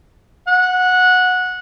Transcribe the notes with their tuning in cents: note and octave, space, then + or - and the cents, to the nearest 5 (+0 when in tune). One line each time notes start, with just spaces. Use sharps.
F#5 -15